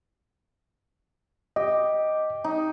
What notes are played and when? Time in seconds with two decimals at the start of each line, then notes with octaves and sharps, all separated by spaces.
1.56 G4 D#5
2.44 D#4